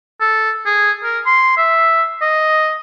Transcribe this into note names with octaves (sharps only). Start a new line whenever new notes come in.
A4
G#4
A#4
C6
E5
D#5